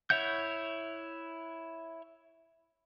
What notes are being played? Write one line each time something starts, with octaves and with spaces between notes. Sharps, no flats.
E4 C#5 E5 F#5 G6